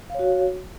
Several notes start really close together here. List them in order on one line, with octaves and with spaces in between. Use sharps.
F5 C#5 F#4